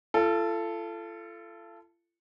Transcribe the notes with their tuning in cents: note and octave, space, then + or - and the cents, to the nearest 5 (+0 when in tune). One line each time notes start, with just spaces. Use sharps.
F4 -40 A4 +0